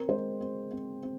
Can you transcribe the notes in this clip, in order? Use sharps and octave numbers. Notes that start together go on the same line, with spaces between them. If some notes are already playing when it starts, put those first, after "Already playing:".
Already playing: C4 A#4
G#3 C5
C4
C4
C4